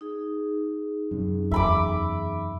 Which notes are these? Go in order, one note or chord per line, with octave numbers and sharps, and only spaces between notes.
D#4 G#4
F#2 C3
E2 E5 B5 D6